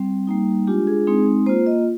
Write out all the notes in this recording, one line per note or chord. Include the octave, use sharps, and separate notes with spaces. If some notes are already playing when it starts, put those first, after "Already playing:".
Already playing: G3 C4
G3 A#3 D#4
G#3 D4 F4 G4
G#4
G#3 C4 D#4 G#4
A#3 F4 C5
D#5